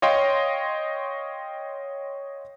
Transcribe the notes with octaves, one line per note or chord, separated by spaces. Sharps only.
C#5 D#5 F5 G5 C6